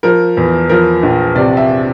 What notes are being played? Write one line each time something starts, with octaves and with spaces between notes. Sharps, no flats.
F3 A#4
E2
F3 A#4
A#1
C3 D5
E5